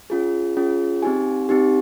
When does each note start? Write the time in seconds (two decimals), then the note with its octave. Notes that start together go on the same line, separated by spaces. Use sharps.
0.10 C#4 F4 G#4
0.57 C#4 F4 G#4
1.02 C4 D#4 G4 G#5
1.49 C4 D#4 G4